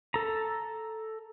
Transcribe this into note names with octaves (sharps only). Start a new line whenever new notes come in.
A4 A#5